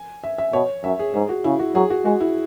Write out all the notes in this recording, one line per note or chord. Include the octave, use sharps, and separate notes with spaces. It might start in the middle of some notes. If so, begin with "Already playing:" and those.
Already playing: G#5
E5
E5
B2 C#5
F#2 E5
G#4
G#2 G#4
F#4
C#3 E4
F#4
F#3 G#4
F#4
G#3 F#4
E4